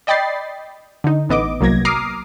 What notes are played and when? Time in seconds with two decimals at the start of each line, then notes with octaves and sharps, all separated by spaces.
0.07 D5 D#5 G5 B5 A6 C7
1.04 D3 D#4
1.29 A1 B3 D#5 D6
1.61 C2 F#3 A#3 G#6 A#6
1.85 A#5 D6 D#6 F6 C7